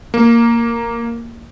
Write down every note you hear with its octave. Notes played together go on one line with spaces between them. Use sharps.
A#3